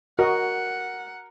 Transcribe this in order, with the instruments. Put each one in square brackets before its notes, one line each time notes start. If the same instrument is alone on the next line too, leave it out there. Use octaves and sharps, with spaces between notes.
[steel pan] F#4 D#5 [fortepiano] A#4 [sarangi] F#5